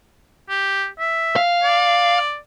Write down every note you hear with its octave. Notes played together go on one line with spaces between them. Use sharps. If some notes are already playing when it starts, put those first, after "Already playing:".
G4
E5
F5
D5